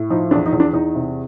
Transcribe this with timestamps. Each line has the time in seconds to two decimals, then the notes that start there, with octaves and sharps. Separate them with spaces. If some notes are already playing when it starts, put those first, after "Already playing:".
Already playing: A2
0.10 F3 D#4
0.31 E2 D4
0.46 D#4
0.53 E2
0.60 D4
0.73 E2 D#4
0.95 C3